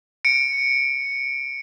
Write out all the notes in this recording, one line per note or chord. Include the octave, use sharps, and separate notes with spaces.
C#7 D7